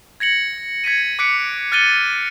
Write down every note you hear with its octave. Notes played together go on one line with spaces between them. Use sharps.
G#6 A#6 C#7 F#7
G#6 B6 C#7 D#7
D6 F#6 B6 C#7 D7
F6 F#6 A6 C#7 D#7 G7